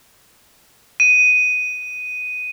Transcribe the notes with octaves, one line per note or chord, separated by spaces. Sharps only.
D#7